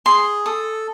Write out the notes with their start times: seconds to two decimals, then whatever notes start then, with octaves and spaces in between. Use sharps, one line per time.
0.06 G#4 C6
0.46 A4 D#6